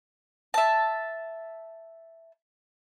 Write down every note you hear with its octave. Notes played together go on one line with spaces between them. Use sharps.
E5 A5